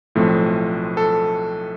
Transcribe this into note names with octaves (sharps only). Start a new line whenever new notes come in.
B1 A2 F3 A3 C4
A4